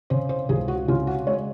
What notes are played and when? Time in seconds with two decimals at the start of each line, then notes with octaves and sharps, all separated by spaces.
0.10 C#3 C5
0.29 C5
0.49 C#2 G#4
0.68 F#4
0.88 C#3 F4
1.07 F#4
1.27 G#3 C#5